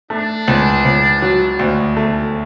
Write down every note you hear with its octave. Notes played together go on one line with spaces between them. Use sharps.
A3 D4
C#2
C#2
F#3
D2
A3